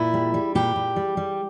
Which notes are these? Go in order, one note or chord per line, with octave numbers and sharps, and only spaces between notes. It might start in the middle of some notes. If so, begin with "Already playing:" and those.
Already playing: A#2 E4
G3
G3
A#2 G4
A#2
G3
G3